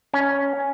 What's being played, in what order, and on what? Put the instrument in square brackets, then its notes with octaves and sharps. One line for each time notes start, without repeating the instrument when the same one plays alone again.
[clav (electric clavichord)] C#4